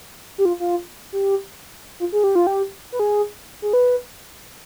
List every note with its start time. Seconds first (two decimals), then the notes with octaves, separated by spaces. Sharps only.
0.38 G4
0.45 F4
0.60 F4
1.13 G4
2.00 F4
2.12 G#4
2.24 G4
2.35 F4
2.47 G4
2.92 B4
2.99 G#4
3.62 G#4
3.73 B4